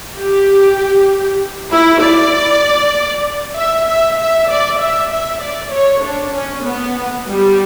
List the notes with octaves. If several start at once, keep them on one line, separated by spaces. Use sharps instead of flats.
G4
E4
D5
E5
E5
E5
D5
E5
E5
D5
C#5
D4
C#4
B3
G3